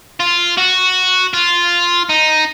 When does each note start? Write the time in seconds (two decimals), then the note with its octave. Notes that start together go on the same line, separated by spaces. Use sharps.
0.20 F4
0.58 F#4
1.34 F4
2.09 D#4